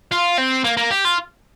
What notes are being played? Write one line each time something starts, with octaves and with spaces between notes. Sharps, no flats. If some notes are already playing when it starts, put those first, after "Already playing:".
F4
C4
A#3
A#3
G4
F4